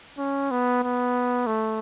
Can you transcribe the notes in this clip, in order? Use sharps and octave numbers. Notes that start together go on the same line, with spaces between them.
C#4
B3
B3
A3